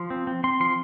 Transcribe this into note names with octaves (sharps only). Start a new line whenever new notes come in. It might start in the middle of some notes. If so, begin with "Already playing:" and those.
Already playing: F3 C6
C4
C4
C4 C6
F3 C6